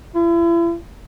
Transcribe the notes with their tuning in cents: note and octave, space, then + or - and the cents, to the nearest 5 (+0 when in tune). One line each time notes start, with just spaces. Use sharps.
E4 +40